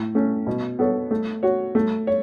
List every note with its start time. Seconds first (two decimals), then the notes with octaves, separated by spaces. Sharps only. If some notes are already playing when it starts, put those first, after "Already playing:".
Already playing: A2
0.15 A3 C#4
0.47 B2
0.79 B3 A4 C#5
1.11 A3
1.43 F#4 C#5
1.75 A3
2.07 C#5